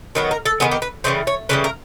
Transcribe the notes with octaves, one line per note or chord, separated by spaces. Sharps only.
D#3 F#3 B3 B4
A#4
A4
D#3 F#3 B3 G#4
G4
B4
C#3 E3 G3 C5
C#5
C#3 E3 G3 B4
A#4